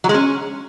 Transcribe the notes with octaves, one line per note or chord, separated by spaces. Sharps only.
F#3
G#3
C#4